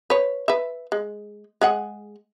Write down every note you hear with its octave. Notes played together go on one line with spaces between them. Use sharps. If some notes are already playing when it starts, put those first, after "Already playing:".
B4 C#5
B4 E5
G#3
G#3 G#4 F#5